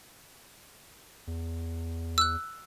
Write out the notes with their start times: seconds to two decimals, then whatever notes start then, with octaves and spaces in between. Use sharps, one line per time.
1.27 E2
2.18 E6 F#6